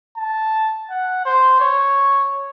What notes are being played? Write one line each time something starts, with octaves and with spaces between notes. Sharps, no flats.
A5
F#5
C5
C#5